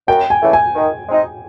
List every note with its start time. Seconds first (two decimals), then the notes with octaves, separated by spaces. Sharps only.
0.08 F#2 G5
0.30 G#5
0.42 C#3 E3 A3
0.53 G#5
0.75 D#3
1.09 G#3 C4 D#4